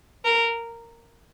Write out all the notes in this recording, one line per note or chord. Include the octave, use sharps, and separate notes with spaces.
A#4